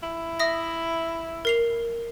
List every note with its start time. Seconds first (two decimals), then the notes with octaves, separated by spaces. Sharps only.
0.03 E4
0.40 E5 D#6 A#6
1.45 A#4 C7 F7